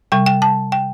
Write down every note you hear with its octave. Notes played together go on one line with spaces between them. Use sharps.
C3 G3 G5
G5
A5
G5